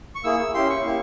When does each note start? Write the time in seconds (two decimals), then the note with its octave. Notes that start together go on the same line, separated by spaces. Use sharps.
0.15 C#6
0.24 A#3 E4 G#4 E6
0.54 C#4 E4 G4 C6
0.70 C#6
0.85 A#3 E4 G4